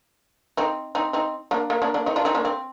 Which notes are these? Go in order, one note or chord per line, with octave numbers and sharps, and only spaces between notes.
C4 D#4
C4 D#4
C4 D#4
A#3 D4
A#3
A#3 D4
A#3 D4
C4 D#4
D4 F4
C4 D#4
A#3 D4
C4